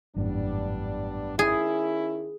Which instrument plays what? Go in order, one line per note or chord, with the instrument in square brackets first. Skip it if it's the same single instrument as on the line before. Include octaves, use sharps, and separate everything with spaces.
[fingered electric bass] G#1 F#2 A2 [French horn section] G3 B3 D4
[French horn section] D#3 C#4 E4 [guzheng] G#4